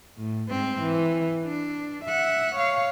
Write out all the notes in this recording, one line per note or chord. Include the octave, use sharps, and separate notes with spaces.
A2
G#2 C4
E3
D4
E5 F#5
C#5 F5